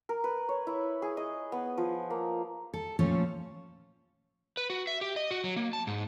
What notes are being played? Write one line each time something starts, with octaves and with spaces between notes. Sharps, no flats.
A#4
B4
C#5
E4
G#4
D#5
B3
F3
A#3
A4
A#2 F3 A3 C#4 F4 A4
B4
F#4
E5
G4
D#5
F#4
F#3
A#3
A5
G#2